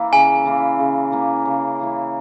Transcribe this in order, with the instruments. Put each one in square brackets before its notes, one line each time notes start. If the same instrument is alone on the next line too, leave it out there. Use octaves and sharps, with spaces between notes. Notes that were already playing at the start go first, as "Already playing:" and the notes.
Already playing: [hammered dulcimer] E3 A#3 E4
[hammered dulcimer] C#3 [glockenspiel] G#5
[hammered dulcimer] E3 A#3 E4
C#3
E3 A#3 E4
C#3
E3 A#3 E4